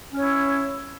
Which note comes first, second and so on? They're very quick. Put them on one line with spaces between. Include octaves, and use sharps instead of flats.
C#4 C#5 E4